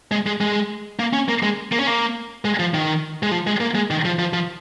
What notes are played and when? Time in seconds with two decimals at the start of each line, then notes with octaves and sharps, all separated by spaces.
0.12 G#3
0.26 G#3
0.41 G#3
0.99 A#3
1.13 C#4
1.29 A#3
1.43 G#3
1.72 A#3
1.79 C#4
1.87 A#3
2.45 G#3
2.59 F3
2.74 D#3
3.23 G#3
3.31 F3
3.47 G#3
3.60 A#3
3.75 G#3
3.90 D#3
4.05 F3
4.19 F3
4.33 F3